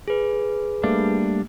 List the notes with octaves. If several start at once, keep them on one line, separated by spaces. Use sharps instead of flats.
G#4 B4
G3 A3 A#3 D4